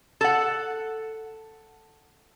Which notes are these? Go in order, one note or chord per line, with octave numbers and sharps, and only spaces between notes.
A4 F#5